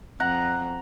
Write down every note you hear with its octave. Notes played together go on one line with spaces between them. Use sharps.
F2 F#5 A#5 F#6